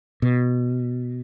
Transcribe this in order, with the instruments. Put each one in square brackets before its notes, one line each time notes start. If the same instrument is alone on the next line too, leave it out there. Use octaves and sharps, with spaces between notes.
[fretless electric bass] B2